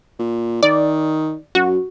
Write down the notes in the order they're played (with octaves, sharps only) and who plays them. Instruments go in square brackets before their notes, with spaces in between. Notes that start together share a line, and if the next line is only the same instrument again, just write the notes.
[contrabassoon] A#2
[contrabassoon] D#3 [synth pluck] D5
[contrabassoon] F#2 [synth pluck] F#4